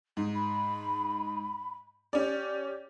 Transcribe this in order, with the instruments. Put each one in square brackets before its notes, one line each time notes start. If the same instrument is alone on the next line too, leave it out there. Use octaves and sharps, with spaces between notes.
[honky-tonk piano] G#2 [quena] D#4
[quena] B5
[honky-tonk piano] C#4 D5 [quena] G4